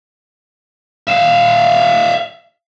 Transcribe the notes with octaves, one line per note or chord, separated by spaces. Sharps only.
E5 F5